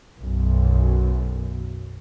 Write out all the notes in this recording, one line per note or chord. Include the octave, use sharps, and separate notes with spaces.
B1 F#2